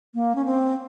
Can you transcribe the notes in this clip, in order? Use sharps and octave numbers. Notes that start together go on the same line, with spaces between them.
A#3
C#4
C4